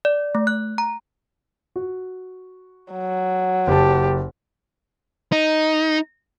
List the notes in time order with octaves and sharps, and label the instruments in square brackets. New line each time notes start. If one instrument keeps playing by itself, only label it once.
[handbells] D5
A3
F#6
A#5
[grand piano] F#4
[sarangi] F#3
[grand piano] F#1 A5 [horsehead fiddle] G4
[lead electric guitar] D#4